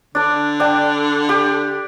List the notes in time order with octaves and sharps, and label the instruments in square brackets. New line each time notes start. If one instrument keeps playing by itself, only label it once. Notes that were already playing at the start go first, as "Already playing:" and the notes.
[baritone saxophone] D3 [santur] D4 D5
[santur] D4 G5
G4